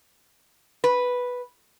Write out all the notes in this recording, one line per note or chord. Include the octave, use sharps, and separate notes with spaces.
B4